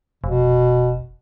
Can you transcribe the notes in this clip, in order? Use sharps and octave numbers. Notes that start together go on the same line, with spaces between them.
F1 B2